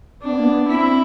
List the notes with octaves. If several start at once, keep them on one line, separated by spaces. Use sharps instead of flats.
C4 D4
B3
A#3
B3
C4 E4